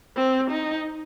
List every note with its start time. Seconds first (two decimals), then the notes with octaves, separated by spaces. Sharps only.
0.16 C4
0.50 D#4